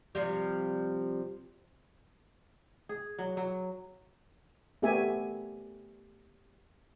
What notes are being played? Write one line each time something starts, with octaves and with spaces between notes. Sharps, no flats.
C3 F3 G3
G#4
F#3
F#3
A3 B3 G4 A#4 E5 G#5